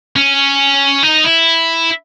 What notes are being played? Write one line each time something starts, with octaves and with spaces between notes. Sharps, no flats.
C#4
D#4
E4